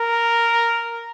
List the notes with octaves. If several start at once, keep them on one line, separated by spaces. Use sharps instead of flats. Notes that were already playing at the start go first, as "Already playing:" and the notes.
Already playing: A#4